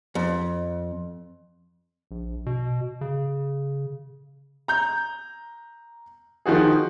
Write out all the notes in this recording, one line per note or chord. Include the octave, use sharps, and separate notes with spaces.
F2
A#1
B2
C#3
A#5 G6
D#3 F3 F#4 G#4